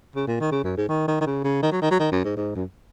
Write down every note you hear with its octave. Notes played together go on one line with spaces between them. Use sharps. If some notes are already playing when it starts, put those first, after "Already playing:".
C#3
A#2
D#3
C#3
F#2
G#2
D#3
D#3
D#3
C#3
C#3
D#3
F#3
D#3
F#3
D#3
F#2
G#2
G#2
F#2